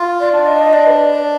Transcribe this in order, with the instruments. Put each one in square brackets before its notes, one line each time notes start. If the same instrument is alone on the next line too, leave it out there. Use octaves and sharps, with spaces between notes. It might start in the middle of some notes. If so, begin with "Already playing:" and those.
Already playing: [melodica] F4
[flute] D5
[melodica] D4
[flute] D#5
[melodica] D4 [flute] D5
[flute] B4
D5
D5